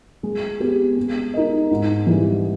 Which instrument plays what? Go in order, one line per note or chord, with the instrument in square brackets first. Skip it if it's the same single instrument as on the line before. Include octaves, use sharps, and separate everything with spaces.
[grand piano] G#3
B3 G4
G#3
D#4 A#4 D#5
G#2
E3 G3